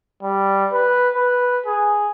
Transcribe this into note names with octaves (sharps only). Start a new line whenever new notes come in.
G3
B4
B4
G#4